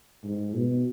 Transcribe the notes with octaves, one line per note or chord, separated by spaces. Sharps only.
G#2
B2